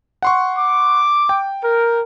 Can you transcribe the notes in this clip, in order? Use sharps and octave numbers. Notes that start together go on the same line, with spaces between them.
F#5 C6 C#6
D6
G5
A#4